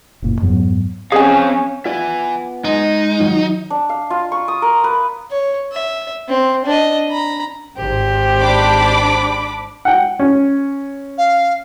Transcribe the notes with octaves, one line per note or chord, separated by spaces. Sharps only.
F#1 A#2
F2 G#2 F#3 B3
C4 C#4 G#4 F5 G#5
B3 F4 D5 E5 G#5
G#3 D#4
D#3 F#3 F4
D4
F5
F4
C#6
D#6
A#4
B4
C#5
E5
C4
D4 D#5
A#5 B5
G#1 G4 C5
D4 B5 D6
F#5 G5
C#4
F5